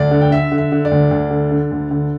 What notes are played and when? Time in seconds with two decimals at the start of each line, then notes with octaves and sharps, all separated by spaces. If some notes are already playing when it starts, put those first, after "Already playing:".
Already playing: D2 D5
0.11 D3
0.21 G5
0.31 D3 E5
0.52 D3
0.58 E5
0.72 D3
0.85 D5
0.91 D2
1.11 D2
1.31 D3
1.52 D3
1.71 D2
1.91 D3